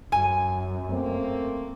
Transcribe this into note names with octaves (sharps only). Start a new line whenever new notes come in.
F#2 G#5
A3 A#3 C4